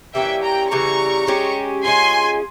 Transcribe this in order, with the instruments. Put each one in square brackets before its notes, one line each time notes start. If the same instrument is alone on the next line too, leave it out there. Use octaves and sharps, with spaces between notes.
[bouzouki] E3 G3 A#3 C#4 [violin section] E5 G5
[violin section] G5 A#5
[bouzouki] C#3 E3 G3 [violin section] A#5 C#6
[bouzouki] G#3 C#4 G4
[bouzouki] G#3 C#4 F4 G#4 [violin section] G#5 C6